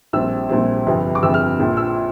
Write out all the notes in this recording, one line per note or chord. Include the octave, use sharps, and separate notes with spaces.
A#1 A#2 G3 C4 E6
A#1 A#2 G3 C4
G1 F2 C3
D6
G1 F2 C3 E6
F6
A#1 A#2 F3
E6